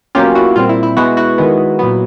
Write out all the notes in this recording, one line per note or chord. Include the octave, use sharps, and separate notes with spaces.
B2 F#3 A#3 C#4 F4 G4
E4 F#4
A#2 G3 C4 F4
E4
E4
B2 G#3 B3 E4 F#4
E4 F#4
D#3 G#3 B3
A#2 F#3 B3